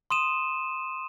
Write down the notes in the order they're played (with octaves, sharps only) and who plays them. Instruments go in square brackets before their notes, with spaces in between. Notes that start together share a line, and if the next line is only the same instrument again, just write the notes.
[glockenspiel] C6 D#6 D#7 E7